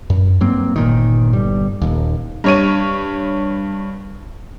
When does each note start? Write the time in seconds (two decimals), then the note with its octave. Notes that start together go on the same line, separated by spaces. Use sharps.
0.10 F#2
0.41 G2 F#3 A#3 C4
0.76 G1 A#2 D#3
1.33 G1 G3
1.82 D#1 D#2
2.44 G2 C#5 D#7